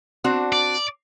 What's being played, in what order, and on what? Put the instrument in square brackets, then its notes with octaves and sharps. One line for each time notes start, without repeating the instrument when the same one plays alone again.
[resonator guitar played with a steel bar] C4 D4 F#4
[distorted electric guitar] D5